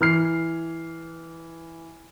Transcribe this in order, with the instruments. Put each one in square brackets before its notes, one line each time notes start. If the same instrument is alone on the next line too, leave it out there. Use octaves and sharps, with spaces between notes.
[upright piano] E3 F6 C7